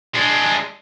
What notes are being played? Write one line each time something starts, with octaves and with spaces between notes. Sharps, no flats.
G#3 D4